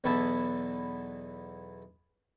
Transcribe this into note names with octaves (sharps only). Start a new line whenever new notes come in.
B1 E2 E3 B3 E5 A5